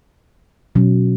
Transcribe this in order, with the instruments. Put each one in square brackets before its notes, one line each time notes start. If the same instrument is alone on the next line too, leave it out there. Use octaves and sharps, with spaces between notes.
[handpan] B2 F#3 C#4